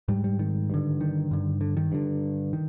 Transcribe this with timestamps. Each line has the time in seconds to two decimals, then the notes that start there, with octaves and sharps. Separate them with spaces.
0.08 G#2 G3
0.24 G3
0.39 D#3
0.70 G2 D3
1.01 D#3
1.31 G2 D3
1.61 D3
1.77 D#3
1.92 G2 D3
2.53 D#3